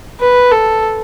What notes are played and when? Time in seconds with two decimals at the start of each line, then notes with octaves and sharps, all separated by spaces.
0.20 B4
0.52 A4